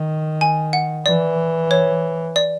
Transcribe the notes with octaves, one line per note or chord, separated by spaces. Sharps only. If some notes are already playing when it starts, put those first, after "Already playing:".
Already playing: D#3
G#5
F#5
E3 D5
C#5
D5